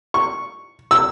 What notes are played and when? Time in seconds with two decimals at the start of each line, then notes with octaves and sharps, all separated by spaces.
0.14 C#6
0.91 E6